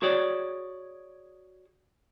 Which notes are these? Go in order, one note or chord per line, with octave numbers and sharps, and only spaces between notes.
F#4 G#4 C#5 D5